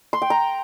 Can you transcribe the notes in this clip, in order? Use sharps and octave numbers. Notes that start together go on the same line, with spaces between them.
C6
G5
A#5